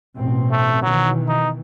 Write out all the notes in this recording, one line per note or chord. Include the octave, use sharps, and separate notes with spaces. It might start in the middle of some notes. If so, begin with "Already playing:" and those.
A1 B2 C4
A3
B2 D#3 E3 F#3
D#4